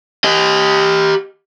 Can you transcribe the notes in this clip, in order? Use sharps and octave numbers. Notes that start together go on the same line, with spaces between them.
G4 D#5